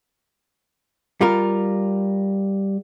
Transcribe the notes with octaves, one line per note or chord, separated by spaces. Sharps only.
G3 F4 A#4